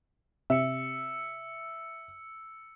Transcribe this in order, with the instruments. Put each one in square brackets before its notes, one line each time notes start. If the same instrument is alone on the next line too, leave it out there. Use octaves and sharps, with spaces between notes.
[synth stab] C3 [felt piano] E5 [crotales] E6 C#7